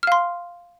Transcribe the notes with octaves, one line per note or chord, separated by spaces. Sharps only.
F5 C6 F6